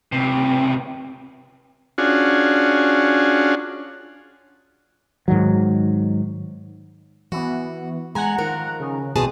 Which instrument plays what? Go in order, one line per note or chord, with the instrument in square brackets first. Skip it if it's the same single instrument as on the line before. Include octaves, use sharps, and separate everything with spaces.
[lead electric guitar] C#2 C3
[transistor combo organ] C#4 D4 F4 F#4 G#4
[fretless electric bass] G#2 D#3 F#3
[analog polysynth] E3 B3 [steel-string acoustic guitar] F#4
[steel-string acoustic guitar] G#3 G#5 [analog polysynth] F#5 A#5
[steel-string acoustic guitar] D#3 F3 A#4
[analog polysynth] C#3
[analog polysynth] A1 C4 D#6 [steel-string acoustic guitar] B2 G#4 A5